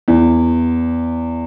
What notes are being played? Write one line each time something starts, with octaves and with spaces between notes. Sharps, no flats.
E2